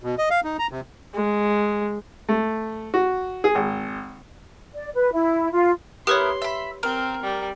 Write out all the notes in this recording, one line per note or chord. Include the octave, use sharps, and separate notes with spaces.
B2
D#5
F5
D#4
A#5
C3
G#3
A3
F#4
G#4
G#1
D5
B4
E4
F4
B3 E4 G4 A#4 B4 C#5 C6
E5 B5
C4 A#4
G3